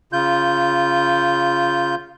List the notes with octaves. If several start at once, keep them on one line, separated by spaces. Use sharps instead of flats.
C#3 F4 G6